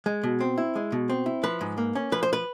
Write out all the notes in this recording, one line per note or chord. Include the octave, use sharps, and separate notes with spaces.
G#3
B2
C4
E4
G#3
B2
C4
E4
F3 B4
G#2
A#3
C#4
F3 B4
C5
B4